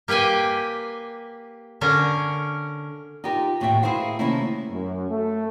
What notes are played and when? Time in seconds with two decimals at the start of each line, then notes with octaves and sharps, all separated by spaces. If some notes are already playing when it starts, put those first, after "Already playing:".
0.08 A#3 G4 B4 G5 G#5
1.81 D3 C#4 A#4
3.24 D#4 F4 G4 A#4
3.60 D#2 A2 F#4 G4 E5 G5
3.82 E4 G#4 A#4 C5 F5 F#5
4.19 C3 D#3 A3 A#3 C#4 E4
4.70 F#2
5.09 A3